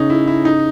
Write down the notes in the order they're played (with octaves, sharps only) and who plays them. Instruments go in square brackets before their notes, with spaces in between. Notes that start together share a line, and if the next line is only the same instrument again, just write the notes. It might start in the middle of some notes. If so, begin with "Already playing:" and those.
Already playing: [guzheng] C#3 [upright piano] C#4 D#4
[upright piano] E4
E4
D#4